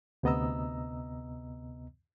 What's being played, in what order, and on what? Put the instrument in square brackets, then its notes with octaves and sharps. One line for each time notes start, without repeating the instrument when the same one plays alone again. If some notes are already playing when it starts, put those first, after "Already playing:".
[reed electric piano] D2 C3 B3 D#5 A#5 E6